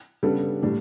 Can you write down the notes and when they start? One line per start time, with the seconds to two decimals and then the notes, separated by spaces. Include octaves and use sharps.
0.23 C#3 G3 B3 D4 A4
0.62 A2 G3 D4